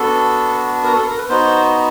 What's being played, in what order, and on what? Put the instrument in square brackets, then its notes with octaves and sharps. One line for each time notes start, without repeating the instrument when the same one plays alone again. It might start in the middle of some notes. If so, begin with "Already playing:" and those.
Already playing: [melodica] B3 D4 F#4 A4
A#4
A4
A#4
B4
B3 D#4 F#4 C5